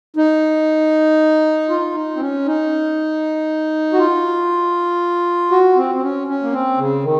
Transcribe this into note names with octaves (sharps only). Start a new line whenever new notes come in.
D#4
F4
D#4
C4
C#4
D#4
F#4
F4
F#4
C4
C4
C#4
C#4
A#3
C4
C#3
D#3